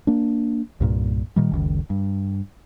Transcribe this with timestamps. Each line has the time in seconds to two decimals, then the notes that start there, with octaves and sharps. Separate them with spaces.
0.07 A#3 D4
0.80 C2 G2 A#2
1.36 A#2 D#3 G3
1.52 F#1 C#2 D#3
1.90 G2